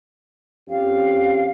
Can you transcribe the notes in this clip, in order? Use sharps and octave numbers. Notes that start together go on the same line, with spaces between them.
F2 C#4 G4 F5